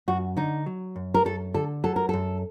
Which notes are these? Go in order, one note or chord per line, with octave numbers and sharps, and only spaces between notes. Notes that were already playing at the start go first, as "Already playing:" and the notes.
F#2 F#4
D3 D#4
F#3
F#2
A#4
F#2 A4
D3 A4
F#3 A4
A#4
F#2 A4